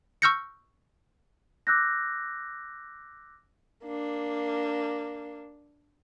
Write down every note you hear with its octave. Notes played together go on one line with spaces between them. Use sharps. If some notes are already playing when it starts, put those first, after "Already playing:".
C#6 E6 F6 G6 A#6 C#7
D6 E6 F#6 G6 A#6
A#3 D4